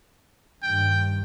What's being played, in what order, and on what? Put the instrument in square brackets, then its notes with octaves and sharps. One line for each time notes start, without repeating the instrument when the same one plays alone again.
[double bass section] G2 D#3 [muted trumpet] G5